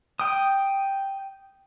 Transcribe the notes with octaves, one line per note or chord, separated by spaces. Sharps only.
G5 D#6